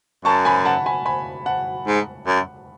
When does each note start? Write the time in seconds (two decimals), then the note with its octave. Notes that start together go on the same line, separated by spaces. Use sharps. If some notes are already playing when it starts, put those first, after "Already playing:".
0.25 F#2 A5 C#6
0.45 G#5 B5
0.65 F#5 A5
0.86 G#5 B5
1.06 G#5 B5
1.46 F#5 A5
1.87 G#2
2.27 F#2